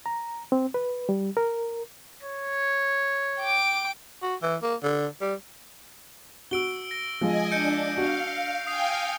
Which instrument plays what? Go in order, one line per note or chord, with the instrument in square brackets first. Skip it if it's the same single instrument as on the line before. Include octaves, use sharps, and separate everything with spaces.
[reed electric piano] A#5
C4
B4
G3
A#4
[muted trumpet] C#5
[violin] G5 D6
[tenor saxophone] F#4
E3
A#3
D3
G3
[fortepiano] F#4 [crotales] E6 D7 G7
[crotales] A#6
[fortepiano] F3 G#3 [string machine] D#5 G#5
[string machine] D4 [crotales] G6 C#7 D7
[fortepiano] F#4 [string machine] F5
[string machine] F5 G5 G#5 [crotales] D#6 C7